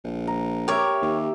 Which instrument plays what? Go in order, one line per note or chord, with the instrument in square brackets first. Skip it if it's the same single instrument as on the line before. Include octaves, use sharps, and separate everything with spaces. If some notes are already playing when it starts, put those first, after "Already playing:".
[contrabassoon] A#1
[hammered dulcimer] A#5
[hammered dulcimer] G4 E5 [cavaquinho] A#4 C#5
[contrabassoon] D#2